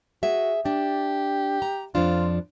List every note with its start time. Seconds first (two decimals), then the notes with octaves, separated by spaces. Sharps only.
0.23 F#4 G#4 E5
0.65 D4 G4
1.62 A#5
1.95 F2 F3 D4 F4